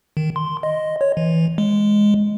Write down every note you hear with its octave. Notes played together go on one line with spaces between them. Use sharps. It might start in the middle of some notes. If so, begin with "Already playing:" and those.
D#3
C6
D#5
C#5
E3
G#3